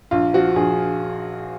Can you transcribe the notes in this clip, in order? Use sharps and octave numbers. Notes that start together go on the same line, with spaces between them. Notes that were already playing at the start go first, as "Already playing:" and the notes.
A#1 F4
F3 F#4
A#1 G#4